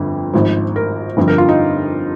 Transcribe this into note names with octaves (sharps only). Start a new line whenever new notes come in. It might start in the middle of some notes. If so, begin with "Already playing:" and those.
Already playing: G1 F2 D3
G#1 G#2 F3
A#4
G1 F2 D3 F3
A#4
F4
D#4